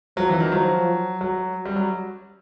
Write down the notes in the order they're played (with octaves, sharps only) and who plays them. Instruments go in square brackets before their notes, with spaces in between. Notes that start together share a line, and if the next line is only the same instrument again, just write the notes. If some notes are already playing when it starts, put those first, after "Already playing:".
[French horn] F3 [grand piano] F#3
[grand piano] E3
D#3
[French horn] F3 [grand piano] F#3
[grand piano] F#3
G3
F#3